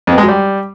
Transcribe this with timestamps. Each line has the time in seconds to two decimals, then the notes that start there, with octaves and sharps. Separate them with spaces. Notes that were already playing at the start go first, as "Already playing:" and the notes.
0.07 F2
0.13 B3
0.18 G#3
0.23 F#3
0.28 G3